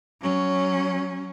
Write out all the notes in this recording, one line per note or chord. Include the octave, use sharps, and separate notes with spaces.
F#3 C#4